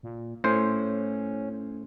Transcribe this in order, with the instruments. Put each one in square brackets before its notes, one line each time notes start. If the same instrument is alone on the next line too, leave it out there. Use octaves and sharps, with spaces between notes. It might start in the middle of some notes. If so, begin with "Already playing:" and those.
[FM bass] A#2
[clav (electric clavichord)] A2 C5 [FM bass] C#4